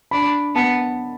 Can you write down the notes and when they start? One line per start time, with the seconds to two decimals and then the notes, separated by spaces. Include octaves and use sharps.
0.11 D4 B5
0.55 B3 A5